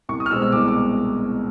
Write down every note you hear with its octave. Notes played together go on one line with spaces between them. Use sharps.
C2 C#6
D#6
F6
B2 G#3 C4 E6
E6
C2 D6
D6